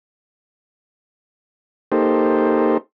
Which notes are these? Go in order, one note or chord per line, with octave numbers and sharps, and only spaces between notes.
A#3 D#4 G4 A4 C5